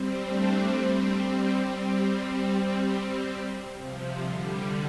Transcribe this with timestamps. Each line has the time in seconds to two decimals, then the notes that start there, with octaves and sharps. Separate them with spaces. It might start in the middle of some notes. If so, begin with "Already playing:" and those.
Already playing: G3 C4
0.22 A3 D4
0.66 G3 C4
1.54 G3 C4
3.76 C3 F3
4.19 D3 G3